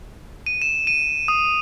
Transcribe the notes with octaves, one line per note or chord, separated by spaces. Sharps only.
D#7
E7
D#7
D#6